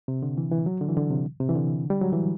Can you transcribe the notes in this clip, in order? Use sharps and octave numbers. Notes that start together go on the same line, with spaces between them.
C3
D3
E3
E3
F#3
D3
E3
D3
C3
C3
E3
D3
G3
F#3
E3